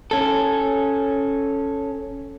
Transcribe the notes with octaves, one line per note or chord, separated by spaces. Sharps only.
C#4 A4